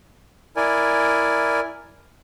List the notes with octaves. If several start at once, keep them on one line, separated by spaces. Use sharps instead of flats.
E4 A#4 D5 G#5